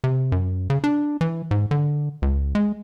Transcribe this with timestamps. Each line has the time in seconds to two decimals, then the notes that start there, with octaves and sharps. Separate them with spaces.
0.04 C3
0.32 F#2
0.70 C#3
0.84 D4
1.21 E3
1.51 G#2
1.71 D3
2.22 C#2
2.55 G#3